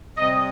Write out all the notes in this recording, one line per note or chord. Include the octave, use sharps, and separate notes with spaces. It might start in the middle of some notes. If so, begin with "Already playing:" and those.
C3 G3 D#5